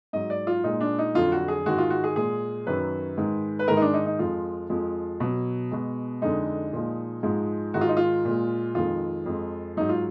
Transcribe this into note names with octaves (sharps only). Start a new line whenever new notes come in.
G#2 F#3 D#5
D5
F4
A#2 G#3 D#4
D4
D#4
F2 D3 F#3 F4
F#4
G#4
G#2 D#3 G#3 F#4
F4
F#4
G#4
A#2 G#3 G#4
F#2 D#3 F#3 B4
G#2 D#3 G#3
B4
G#2 D#3 G#3 A#4
D#4
D4
D#4
D#4
F2 F3 G#3 F4
F2 F3 G#3
B2 F#3
B2 G#3
F2 D3 G#3 D#4
A#2 F3 G#3
G#2 F3 G#3
G#2 D#3 G#3 F#4
F4
D#4
F4
A#2 G#3
F2 D#3 G#3 F4
F2 F3 G#3
G#2 F#3 D#4
F4